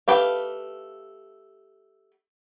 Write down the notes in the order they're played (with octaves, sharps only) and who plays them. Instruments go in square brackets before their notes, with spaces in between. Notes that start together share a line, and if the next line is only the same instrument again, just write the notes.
[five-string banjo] A3 G4 B4 F5